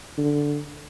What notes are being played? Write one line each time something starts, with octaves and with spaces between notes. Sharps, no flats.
D3